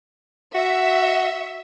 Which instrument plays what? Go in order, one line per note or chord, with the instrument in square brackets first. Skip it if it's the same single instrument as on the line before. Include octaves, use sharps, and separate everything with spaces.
[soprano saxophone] F#4 [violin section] E5